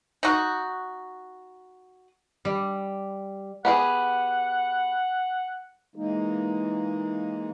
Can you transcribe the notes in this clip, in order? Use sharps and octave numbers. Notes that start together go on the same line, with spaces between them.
D#4 F#4
G3
B3 G4 G#4 F#5
E3 G#3 A#3 D#4